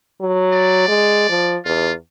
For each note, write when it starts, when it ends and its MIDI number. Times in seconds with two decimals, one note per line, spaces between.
0.21 0.85 54
0.53 1.59 74
0.88 1.28 56
1.29 1.57 53
1.65 1.93 40
1.65 1.92 65